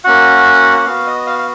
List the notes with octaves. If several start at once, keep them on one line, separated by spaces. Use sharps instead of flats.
A#3 C#4 F#4 F#5
F#5
B3 F#4 F5
D#5
F5
F5